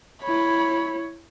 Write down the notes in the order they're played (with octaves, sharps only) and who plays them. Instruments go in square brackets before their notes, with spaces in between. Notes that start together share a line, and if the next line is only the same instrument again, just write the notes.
[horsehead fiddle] E4 C#5 [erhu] B5